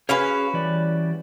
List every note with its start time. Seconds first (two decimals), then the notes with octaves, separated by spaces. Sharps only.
0.09 C#4 F#4 G#4 B4 C#5 F5
0.53 E3 G3 D5